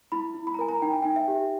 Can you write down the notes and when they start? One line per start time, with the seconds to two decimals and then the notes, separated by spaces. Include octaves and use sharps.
0.12 E4 B5
0.34 E4
0.47 B5
0.54 A#5
0.59 A#4 G#5
0.69 A#5
0.82 D#4 G5
0.92 G#5
1.02 D#4 G5
1.16 E5
1.28 G4